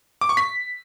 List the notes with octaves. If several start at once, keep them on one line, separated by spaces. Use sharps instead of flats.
D6
C#6
B6